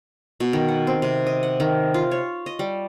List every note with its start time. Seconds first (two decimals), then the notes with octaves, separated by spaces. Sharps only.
0.40 B2
0.53 D#3
0.68 F#5
0.87 C4
1.02 C3
1.26 D#5
1.43 F#5
1.60 D#3
1.94 F4
2.11 C#5
2.46 D#5
2.59 G3